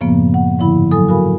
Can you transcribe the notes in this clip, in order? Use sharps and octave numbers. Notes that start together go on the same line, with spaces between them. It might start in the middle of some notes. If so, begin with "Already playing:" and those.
F#2 A2 C#3 F3 A#3 B3
F#5
G#2 D3 F3 E4 B5
F#3 A4 G#5 D#6
F#4 A#4 F5 G#5 B5